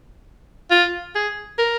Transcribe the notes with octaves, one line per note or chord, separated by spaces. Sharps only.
F4
G#4
A#4